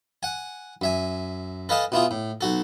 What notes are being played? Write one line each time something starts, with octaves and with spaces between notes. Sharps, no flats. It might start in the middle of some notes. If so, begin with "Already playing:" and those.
F#5 G#5
F#2 E5 G#5
A4 B4 D#5 F5 G#5 A5
B2 E4 F4 G#4
A2
B1 F#4 A4